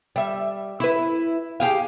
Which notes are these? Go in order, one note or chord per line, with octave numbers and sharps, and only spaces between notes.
G3 E5
E4 B4
G4 G#4 F5